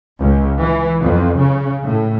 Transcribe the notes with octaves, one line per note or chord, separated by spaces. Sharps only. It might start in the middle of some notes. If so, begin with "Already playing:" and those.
C#2
E3
F2
C#3
A2